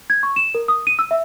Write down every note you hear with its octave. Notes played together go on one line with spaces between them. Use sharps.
G#6
C#6
E7
A#4
D#6
D#7
E6
E5